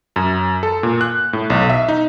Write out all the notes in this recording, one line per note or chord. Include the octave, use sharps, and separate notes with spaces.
F#2
A4
A#2
F#6
A2
B1
E5
D#4